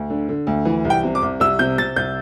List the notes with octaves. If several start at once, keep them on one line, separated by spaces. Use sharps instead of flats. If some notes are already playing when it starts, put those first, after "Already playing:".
Already playing: D2
D3
D3
D2
E3
C2
G5
C3
D6
C2
C2 E6
C3 G6
C3 A6
C2 G6